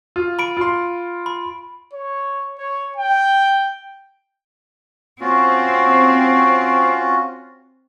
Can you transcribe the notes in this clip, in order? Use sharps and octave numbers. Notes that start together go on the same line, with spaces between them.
F4
B5 D7
F4 C6
B5
C#5
C#5
G5
C4 C#4 F4 F#4